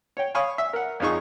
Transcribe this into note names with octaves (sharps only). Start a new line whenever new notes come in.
C#5 G5
C#5 F5 G#5 B5 C#6 D#6
E5
A#4 F#5
F2 F3 D#4 G#4 C#6